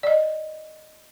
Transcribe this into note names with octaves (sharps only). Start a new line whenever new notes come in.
D5 D#5